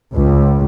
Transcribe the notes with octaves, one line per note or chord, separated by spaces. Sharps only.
C#2